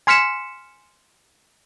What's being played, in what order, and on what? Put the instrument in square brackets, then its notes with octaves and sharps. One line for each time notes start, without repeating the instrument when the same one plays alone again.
[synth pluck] G#5 C6 F6 B6 C#7 E7